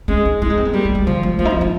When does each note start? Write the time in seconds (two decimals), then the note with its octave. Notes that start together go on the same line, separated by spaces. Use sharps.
0.08 G#3 C#4
0.26 D#4
0.41 G#3 E4
0.50 D#4
0.57 C4
0.65 B3
0.73 G3 A#3
0.85 G#3
0.95 G3
1.06 D3 F3
1.23 G#3
1.39 F3 A#3
1.45 D#4
1.50 D4
1.61 D#4